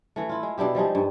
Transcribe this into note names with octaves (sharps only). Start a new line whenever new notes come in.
E3 A3
E4 F4
G#3
B2 D4 E4 G4
F3 G3 G#3 D#4
G2